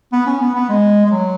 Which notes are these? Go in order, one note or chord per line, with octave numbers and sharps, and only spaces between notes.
B3
C#4
B3
B3
G#3
G#3
F#3